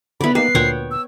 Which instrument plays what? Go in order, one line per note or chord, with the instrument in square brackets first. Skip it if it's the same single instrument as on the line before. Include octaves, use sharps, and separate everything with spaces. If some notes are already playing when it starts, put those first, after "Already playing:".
[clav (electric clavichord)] D3 E4 [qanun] B3 D5 [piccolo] B5
[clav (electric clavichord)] A#3 D#4 G4 [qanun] B4 [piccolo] C7
[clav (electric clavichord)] D2 A#2 C5 [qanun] C#5 F#5 G5
[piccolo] E6